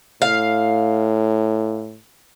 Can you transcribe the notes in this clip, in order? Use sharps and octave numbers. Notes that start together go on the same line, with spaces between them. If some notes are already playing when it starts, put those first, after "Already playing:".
A2 F5